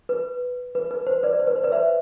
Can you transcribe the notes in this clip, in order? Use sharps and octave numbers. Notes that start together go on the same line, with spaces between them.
B4
B4
B4
C5
B4 D5
C5
B4
C5
B4 D5
C5 E5